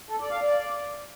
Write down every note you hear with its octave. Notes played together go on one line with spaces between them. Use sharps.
A4
D5
F5
D5